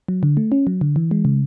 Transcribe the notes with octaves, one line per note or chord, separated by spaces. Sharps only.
F#3
D3
A3
C#4
F#3
D3
E3
G#3
C#3